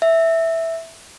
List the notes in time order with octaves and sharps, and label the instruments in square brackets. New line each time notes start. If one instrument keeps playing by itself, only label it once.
[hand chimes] E5